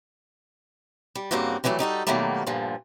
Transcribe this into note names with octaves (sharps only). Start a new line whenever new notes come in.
G3
G2 C#3 A#3 C4 F#4
D3 E3 F#3 G3 A3
G3 D#4 F#4 A4
B2 D#3 F#3 G3 A3 A#3
G2 A#2 D3 F3